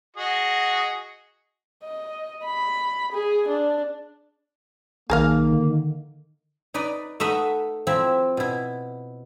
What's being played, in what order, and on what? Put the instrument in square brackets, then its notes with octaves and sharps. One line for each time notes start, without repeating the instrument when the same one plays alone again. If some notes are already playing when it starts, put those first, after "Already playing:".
[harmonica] F#4 G#4 D#5
[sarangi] D#5
B5
G#4
D4
[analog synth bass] B1 [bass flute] D#3 [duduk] A#3 [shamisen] G#4 A#4 F5
[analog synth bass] D3
[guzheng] D#4 B4 D5 D#5
A3 D#4 B4 D#5 E5 F#5
F3 C4 E4 E5
B2 E4